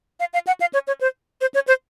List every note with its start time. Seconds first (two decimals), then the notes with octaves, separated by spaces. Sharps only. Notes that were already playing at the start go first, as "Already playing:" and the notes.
0.20 F5
0.33 F5
0.47 F#5
0.61 F5
0.74 C#5
0.87 C#5
1.01 C5
1.41 C5
1.54 C#5
1.68 C5